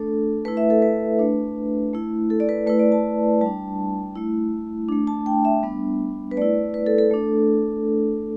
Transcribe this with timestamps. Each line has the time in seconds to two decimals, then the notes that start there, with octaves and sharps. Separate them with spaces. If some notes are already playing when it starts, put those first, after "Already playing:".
Already playing: A3 D4 A4
0.45 A3 E4 B4
0.57 E5
0.70 A4
0.82 B4
1.19 A3 D4
1.93 A3 E4
2.30 A4
2.40 D5
2.49 B4
2.67 A3 E4 B4
2.79 D5
2.92 A5
3.41 G3 D4 A5
4.16 A3 E4
4.89 A3 D4
5.07 A5
5.26 G5
5.45 E5
5.63 G3 B3 D4
6.31 B4
6.37 A3 E4 D5
6.74 B4
6.86 A4
6.98 A4
7.11 A3 D4